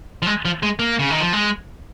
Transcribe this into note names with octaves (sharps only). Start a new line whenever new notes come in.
F3
G#3
F3
G#3
A#3
C#3
D#3
F3
G#3